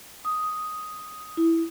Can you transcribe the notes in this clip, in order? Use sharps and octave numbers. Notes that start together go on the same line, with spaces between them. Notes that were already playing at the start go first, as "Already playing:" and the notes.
D#6
E4